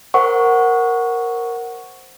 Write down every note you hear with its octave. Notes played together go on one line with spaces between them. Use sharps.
A#4 C5 F#5 C#6